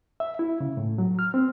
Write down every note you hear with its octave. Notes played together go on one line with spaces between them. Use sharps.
E5
E4
C#3
A2
F#3
F6
C4